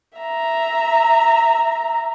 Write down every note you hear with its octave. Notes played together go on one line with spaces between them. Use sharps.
E5 A#5